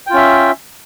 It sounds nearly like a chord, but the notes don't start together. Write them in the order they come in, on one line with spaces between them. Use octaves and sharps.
G5 F4 C#4 E5